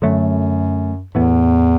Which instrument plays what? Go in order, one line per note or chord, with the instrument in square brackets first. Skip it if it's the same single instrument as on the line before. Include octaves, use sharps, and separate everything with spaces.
[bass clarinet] F#2 [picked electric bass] D3 F#3 A3
[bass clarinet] E2 [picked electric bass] A2 E3 B3